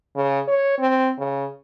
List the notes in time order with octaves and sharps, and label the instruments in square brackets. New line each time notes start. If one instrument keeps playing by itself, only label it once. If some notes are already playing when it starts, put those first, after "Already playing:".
[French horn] C#3
C#5
C4
C#3